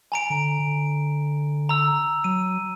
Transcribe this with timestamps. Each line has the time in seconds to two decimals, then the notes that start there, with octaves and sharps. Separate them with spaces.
0.12 G#5 A#5 D7
0.30 D3
0.59 D3
1.69 A#5 E6
2.24 F#3 D#7